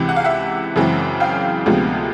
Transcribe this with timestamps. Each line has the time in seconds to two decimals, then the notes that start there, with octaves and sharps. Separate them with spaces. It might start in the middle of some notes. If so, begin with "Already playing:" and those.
Already playing: C#2 C3 E3
0.09 F#5
0.16 F5
0.24 E5 F#5
0.76 F#2 C#3 E3 G#3 C4
1.20 F5 G5
1.66 D2 C3 F3 G#3 B3